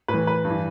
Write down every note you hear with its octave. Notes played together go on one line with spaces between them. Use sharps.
A2 B4
E3
B4
G2
E3